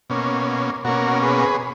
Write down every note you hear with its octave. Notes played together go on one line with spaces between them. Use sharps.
B2 A#3 C#4
B2 A#3 C#4 F#4 A#4
G#4 B4